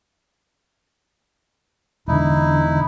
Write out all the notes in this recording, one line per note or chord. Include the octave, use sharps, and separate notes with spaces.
E1 D3 D#4 E4